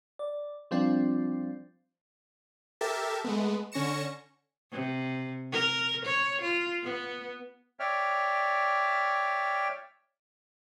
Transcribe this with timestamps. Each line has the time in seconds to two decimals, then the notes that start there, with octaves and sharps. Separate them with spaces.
0.19 D5
0.71 F3 G3 C4 D4 F4
2.81 G4 A4 A#4 E5 A5
3.24 G#3 A3 B3
3.72 D3 C#4 C#6 A#6 C#7 E7
4.72 C3
5.53 A#4
6.06 C#5
6.42 F4
6.83 B3
7.79 C#5 D5 E5 G5 F6